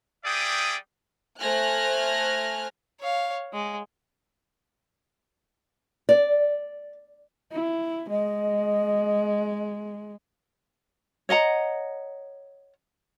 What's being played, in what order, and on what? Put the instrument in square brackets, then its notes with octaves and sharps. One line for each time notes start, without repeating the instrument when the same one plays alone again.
[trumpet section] G3 G#4 D5 E5 G5 D#6
[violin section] A3 C5 G#5 F6 F#6 A#6
[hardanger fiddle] C#5 F5
G#3
[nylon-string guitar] D5
[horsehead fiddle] E4
[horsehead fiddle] G#3 [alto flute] D#5
[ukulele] C#5 D#5 F#5 A#5